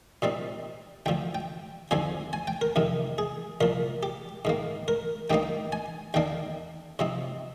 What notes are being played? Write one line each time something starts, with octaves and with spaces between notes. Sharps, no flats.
A#2 G3 C4 D#4
D2 D3 F3 G5
G5
D#2 D3 F3 C4 G#5
G#5
G5
A#4
F2 C3 D#3
G#4
C2 A#2 F3 A#4
G4
G#2 D#3 A#3
A#4
G2 D#3 A#3 D#4 G5
G#5
D#2 D#3 A#3 D4 G5
C3 F3 C4 D#4